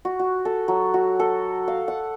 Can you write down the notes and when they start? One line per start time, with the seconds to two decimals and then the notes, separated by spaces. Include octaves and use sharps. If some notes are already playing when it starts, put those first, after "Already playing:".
0.05 F#4
0.19 F#4
0.45 A4
0.68 F#3
0.94 F#4
1.20 A4
1.68 F5
1.88 F#5